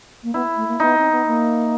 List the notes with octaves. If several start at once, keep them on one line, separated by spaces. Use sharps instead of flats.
A#3
B3 E4
A3
A#3
B3 D#4
C4
B3
A#3